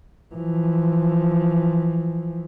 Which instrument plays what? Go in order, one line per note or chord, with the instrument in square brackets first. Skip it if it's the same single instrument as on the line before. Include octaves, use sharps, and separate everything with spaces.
[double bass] E3 F3